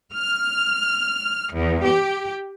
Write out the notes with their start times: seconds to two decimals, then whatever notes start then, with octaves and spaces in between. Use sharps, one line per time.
0.14 F6
1.54 E2
1.85 G4